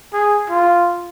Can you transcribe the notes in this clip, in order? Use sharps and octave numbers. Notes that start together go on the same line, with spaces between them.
G#4
F4